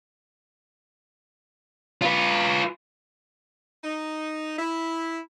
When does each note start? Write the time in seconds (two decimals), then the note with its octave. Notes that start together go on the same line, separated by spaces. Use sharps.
2.02 F4 B4
3.83 D#4
4.58 E4